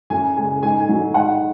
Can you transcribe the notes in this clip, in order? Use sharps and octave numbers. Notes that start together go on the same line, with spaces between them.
F#2 G#5
C#3 G#3 G#5
G#2 G#5
G#5
F#3
G#2 F#5